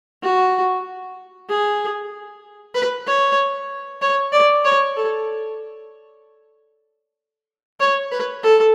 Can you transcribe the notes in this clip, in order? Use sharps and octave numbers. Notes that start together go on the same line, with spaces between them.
F#4
G#4
B4
C#5
C#5
D5
C#5
A4
C#5
B4
A4